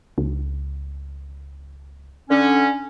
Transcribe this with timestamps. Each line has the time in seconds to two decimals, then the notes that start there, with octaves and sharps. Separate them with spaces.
0.18 C#2
2.30 D3 C#4